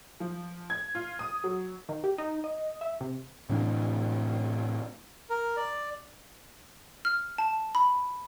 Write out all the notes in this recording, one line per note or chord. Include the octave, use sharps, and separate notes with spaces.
F3
G#6
F4
D#6
F#3
D#3
G4
D#4
D#5
E5
C3
A2 C3 E3 D4
A#4
D5
F6
A5
B5